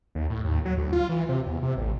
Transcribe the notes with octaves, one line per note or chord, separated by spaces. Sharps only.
D#2
A2
D#2
F#3
D2
F4
E3
C3
E2
C3
A1